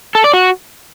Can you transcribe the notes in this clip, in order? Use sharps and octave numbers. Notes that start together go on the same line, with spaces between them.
A4
D5
F#4